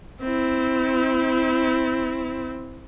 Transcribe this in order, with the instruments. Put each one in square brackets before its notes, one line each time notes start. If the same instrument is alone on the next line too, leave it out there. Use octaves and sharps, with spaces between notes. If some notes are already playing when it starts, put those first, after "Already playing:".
[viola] C4 E4